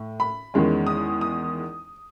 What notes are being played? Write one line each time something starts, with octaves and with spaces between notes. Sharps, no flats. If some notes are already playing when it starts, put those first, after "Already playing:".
Already playing: A2
B5
E2 D#3 G#3 C#4
D#6
D#6